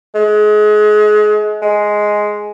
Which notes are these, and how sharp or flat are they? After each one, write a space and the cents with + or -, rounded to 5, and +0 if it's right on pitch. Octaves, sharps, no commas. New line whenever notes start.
G#3 +30
G#3 +5